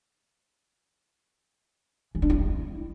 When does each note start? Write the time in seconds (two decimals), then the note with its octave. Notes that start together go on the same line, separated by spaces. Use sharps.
2.15 E3
2.22 D4
2.30 E4